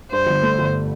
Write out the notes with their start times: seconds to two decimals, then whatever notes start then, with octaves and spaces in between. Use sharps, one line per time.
0.11 G2 C5
0.27 G1
0.42 A3
0.59 G1